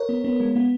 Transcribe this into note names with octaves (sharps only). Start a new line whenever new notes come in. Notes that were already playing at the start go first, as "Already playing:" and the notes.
Already playing: A#4 C#5
B3
B3
G#3
B3